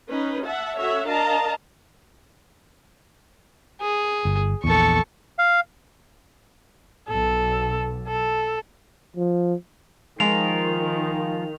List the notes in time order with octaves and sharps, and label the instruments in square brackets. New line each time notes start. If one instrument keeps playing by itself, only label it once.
[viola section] C#4 D#4 B4
E5 F#5 A5
C#4 F#4 A4 C#5 E5 F#5
D4 A#4 D#5 F5 A5 A#5
[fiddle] G#4
[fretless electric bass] G1
[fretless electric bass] A#1 E2 [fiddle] A4 C#6
[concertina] F5
[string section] B1 [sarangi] A4
[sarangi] A4
[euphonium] F3
[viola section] D#3 [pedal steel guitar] F3 F4 A#4 [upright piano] G#3 [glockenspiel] F7